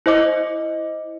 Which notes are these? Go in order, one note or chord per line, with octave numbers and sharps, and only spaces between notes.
E4 C5 D#5 D6